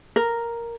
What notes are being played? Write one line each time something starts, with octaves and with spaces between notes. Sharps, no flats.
A#4